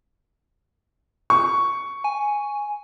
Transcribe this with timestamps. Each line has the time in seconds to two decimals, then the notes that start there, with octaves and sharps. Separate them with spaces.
1.30 C#6
2.04 G#5